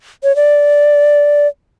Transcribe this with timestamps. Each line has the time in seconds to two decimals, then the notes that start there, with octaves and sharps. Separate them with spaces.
0.23 C#5
0.36 D5